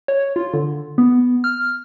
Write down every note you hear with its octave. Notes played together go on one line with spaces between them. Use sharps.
C#5
F4
D3
B3
F6